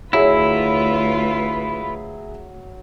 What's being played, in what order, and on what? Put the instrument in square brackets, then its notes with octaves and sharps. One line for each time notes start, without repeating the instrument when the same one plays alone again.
[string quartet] D2 F4 B4 [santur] F#3 [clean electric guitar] E4 [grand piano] G#4 E5